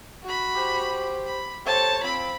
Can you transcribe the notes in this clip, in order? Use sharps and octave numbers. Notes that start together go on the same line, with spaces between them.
F#4 B5
G4 C5
B5
G4 A4 C5 C#5 A5
F3 C4 B5